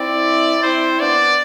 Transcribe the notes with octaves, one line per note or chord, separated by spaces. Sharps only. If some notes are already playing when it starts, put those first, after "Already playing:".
Already playing: C4 E4 D5
C4 E4 C5
B3 D4 D5